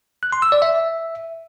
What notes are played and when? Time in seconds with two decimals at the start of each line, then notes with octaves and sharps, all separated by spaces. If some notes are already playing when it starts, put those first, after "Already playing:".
0.23 F#6
0.32 C6
0.42 E6
0.52 D5
0.62 E5